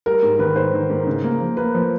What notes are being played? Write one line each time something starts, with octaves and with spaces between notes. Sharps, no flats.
G3 A#4
G#2
D#3 B4
G#2 C5
D#3
G#2
C#3
A#3
F3
A#3 B4
F3